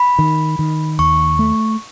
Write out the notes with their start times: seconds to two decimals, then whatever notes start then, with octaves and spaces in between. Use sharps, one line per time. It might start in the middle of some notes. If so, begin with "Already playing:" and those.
Already playing: B5
0.19 D#3
0.59 D#3
0.99 D#2 C#6
1.39 A3